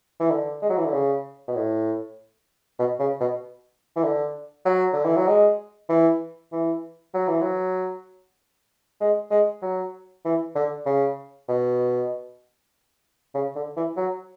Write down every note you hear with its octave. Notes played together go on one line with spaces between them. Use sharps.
E3
D3
G#3
F#3
E3
D3
C#3
B2
A2
B2
C#3
B2
E3
D3
F#3
D3
E3
F#3
G#3
E3
E3
F#3
E3
F#3
G#3
G#3
F#3
E3
D3
C#3
B2
C#3
D3
E3
F#3